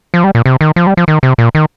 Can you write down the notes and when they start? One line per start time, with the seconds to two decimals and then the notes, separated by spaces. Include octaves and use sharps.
0.14 F3
0.24 G3
0.35 A#2
0.46 C3
0.61 D#3
0.76 F3
0.87 G3
0.97 F3
1.08 D#3
1.23 C3
1.38 A#2
1.55 D#3